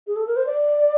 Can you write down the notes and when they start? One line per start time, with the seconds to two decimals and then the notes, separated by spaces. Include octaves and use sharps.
0.07 G#4
0.16 A4
0.27 A#4
0.36 C5
0.46 D5